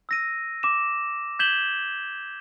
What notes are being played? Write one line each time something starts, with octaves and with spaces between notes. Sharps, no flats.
E6 A#6 D#7
D6 E7
G6 G#6 B6 E7 F#7 G7